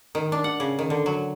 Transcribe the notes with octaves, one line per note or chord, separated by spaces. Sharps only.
D#3
D4
F#5
C#3
D#3
D3
F#3